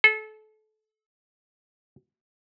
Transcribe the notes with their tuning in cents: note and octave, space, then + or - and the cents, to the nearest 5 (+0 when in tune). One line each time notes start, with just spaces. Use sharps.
A4 -30